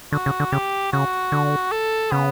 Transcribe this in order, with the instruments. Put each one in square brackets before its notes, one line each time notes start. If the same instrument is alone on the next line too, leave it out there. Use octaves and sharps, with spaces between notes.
[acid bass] D3 [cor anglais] F#4
[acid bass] C#3
D3
[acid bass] C#3 [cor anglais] G4
[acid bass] C#3 [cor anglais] F#4
[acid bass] D3
[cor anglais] A4
[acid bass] C#3 [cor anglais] B3